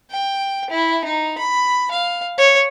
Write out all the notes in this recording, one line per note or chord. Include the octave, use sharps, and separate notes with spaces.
G5
E4
D#4
B5
F5
C#5